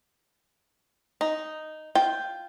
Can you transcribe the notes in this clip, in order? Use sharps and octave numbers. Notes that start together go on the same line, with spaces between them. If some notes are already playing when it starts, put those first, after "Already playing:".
D#4
F4 G5